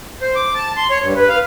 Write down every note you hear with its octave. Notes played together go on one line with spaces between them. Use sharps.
C5
D6
A5
C6
C#5
G2
B4
F5